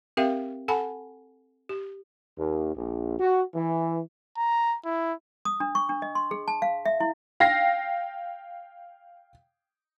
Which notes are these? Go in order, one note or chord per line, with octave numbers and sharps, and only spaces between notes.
C4 G4 A#4 E5 F5 G5
A4 F#5 G#5 A5 B5
G4
D#2
A#1
F#4
E3
A#5
E4
D#6
D4
C#6
D4
D#5
C6
G#4
A5
F5
E5
E4
F5 G5 A#6 C7